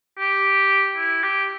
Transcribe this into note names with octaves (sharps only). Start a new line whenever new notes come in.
G4
E4
G4